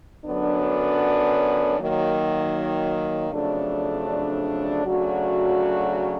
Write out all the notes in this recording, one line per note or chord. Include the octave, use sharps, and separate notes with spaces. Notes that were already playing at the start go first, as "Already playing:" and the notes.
F#2 D3 F#3 B3 D4
D#3 F#3 A#3
F2 C#3 F#3 A3 D4
C#3 F#3 A3 D4 F#4